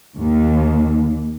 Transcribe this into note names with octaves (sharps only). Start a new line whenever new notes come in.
D#2